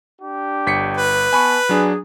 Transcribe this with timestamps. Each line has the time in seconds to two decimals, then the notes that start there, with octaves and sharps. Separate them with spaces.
0.20 D4 G4
0.66 G1 B6 C#7
0.97 B4
1.33 B3 G#5 A5 B5 C#6
1.69 F#3 D4 G#4